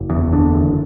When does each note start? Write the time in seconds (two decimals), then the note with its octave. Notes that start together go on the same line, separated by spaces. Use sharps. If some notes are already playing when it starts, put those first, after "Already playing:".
Already playing: F#1
0.10 E2
0.33 D3
0.55 F#1